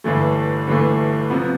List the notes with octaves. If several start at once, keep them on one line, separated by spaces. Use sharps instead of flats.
G1 G2 E3 A3
G1 G2 E3 A3
C3 F3 B3